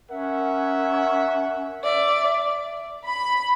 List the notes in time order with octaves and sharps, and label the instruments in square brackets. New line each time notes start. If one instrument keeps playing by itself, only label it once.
[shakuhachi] C#4 [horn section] A#4 E5 F#5
[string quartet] D5 [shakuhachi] E5
[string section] B5